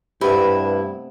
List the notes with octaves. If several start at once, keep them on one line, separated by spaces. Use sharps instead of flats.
G2 C3 A3 B3 E4 G4 B4